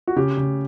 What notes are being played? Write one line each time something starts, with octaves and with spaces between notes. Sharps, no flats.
F#4
C#3 G4
C#3